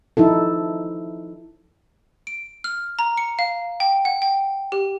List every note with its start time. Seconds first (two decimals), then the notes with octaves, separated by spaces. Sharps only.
0.17 F3 D#4 E4 A4
2.27 D7
2.64 F6
2.99 A#5
3.17 C#7
3.39 F5
3.80 G5
4.05 F#5
4.22 G5
4.72 G4